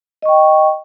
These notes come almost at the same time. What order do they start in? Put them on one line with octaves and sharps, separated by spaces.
D#5 C#6 G5